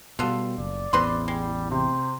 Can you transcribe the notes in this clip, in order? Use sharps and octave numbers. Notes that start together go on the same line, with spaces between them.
B2 G3 B3 F4 A4
F#1 D5
A1 E2 C4 B4 C6
G3 G#3
C3 C5